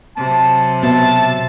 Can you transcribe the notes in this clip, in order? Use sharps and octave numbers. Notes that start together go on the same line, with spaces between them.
C3 F#3 A5
B2 E5 A5